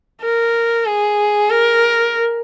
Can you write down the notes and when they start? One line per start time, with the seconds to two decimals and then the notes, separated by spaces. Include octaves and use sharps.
0.22 A#4
0.86 G#4
1.50 A#4